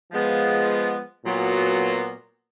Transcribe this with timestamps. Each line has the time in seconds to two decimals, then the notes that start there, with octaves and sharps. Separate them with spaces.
0.11 F3 G#3 B3
1.24 A#2 F#3 B3